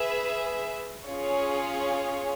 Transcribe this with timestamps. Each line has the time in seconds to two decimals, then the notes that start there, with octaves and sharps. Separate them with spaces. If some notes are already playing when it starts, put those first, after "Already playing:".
Already playing: G#4 B4 E5
1.06 C#4 F4 G#4 C#5